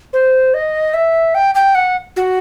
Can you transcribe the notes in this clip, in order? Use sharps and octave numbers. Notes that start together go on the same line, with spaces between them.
C5
D#5
E5
G5
G5
F#5
F#4